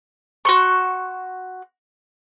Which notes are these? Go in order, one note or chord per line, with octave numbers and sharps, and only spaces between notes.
F#4 C6 C#6